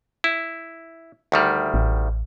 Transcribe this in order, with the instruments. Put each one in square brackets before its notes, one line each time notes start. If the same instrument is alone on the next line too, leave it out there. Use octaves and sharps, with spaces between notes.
[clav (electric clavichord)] E4
D2 D#3 G3
[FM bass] A1